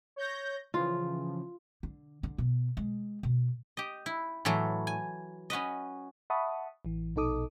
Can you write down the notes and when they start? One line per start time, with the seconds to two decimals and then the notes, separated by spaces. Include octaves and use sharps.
0.16 C#5 G6 A#6
0.74 C#3 E3 F3 F4
1.83 D3
2.23 D3
2.38 B2
2.77 G#3
3.23 B2
3.77 G4 D#5
4.06 E4
4.45 A2 E3 F#3 A3
4.87 G#5
5.50 C#4 F#4 B4 D#5
6.30 E5 F#5 A5 B5 C#6 D#6
6.85 A1 E3
7.16 A#1 B2 D#4 A4 D6 D#6